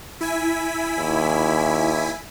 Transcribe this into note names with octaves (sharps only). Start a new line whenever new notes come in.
E4 G#5 B6
D#2